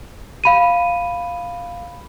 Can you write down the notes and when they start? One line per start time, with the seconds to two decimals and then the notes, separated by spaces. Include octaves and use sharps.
0.44 F5 B5 D#7